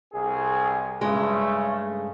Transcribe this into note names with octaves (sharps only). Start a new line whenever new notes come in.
C2 G#4
G2 C#3 G#3 A3